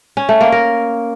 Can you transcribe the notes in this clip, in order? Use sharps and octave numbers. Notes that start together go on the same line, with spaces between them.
C#4
A3
A#3
A#4